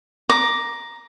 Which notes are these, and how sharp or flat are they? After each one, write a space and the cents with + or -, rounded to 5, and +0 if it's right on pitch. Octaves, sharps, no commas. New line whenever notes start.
A#5 +10 D6 +0